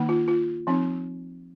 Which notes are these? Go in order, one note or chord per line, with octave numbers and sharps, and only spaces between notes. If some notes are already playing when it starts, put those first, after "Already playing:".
Already playing: D#3 A#3 D#4
F4
F4
F3 C4 D#4